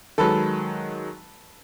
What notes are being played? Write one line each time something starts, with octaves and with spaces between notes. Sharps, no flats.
D#3 F#3 G#3 A4 B4